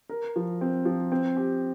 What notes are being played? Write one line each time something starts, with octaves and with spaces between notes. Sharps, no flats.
A#4
F3
C4
F3
C4
G4